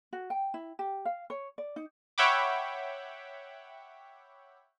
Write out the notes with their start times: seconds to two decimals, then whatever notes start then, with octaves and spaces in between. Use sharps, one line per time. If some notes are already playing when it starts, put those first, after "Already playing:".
0.13 F#4
0.30 G5
0.54 E4
0.79 G4
1.05 F5
1.30 C#5
1.58 D5
1.76 D#4
2.18 C#5 E5 F#5 G5 B5 D6